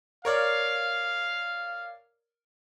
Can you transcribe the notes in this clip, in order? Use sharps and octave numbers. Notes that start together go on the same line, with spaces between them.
A#4 C#5 D5 F5